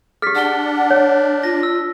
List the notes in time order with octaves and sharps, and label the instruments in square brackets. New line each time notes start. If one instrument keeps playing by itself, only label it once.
[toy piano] G4 G#4 [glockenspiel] F6 A6 B6
[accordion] D4 [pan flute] F#5 [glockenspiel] F6 G7
[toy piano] C#5
[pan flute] F4 [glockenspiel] A#6
[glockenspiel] E6